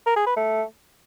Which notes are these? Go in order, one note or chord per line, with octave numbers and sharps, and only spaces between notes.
A#4
G#4
B4
A3